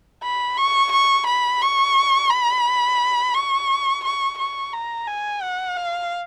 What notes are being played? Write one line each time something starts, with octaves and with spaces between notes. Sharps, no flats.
B5
C#6
C#6
B5
C#6
B5
C#6
C#6
C#6
A#5
G#5
F#5
F5